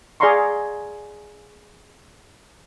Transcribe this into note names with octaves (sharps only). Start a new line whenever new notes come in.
G#4 D5 F5 A#5 C6 C#6